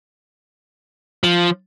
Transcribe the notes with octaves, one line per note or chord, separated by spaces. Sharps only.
F3